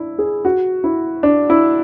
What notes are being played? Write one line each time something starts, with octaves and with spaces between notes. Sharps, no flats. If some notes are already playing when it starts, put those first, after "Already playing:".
Already playing: D4 E4
G#4
F#4
E4
D4
E4